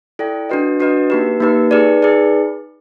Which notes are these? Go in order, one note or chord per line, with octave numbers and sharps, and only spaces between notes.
E4 A4 D5 G5
D4 F#4 B4 D#5
D4 F#4 B4 D#5
A#3 D#4 G4 B4
A#3 D#4 G4 B4
D#4 G#4 B4 D5
D#4 G#4 B4 D5